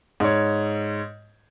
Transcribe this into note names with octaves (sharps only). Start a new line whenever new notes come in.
G#2 C#5